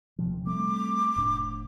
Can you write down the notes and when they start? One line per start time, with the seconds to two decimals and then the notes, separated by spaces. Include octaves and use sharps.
0.19 D#1 C3 F3
0.46 G3 A3 C4 D6
1.16 F1 A2 D4